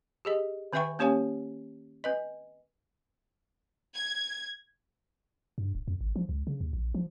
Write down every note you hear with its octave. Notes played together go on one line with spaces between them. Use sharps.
G4 G#4 D#5
D#3 C4 B4 E5 G5 C#6
A#3 C#4 G4 C#5 F5 G#5
C4 B4 D#5
G#6
G2
D1
F2
G#1
F3
C#2
C#3
D#2
A#1
F3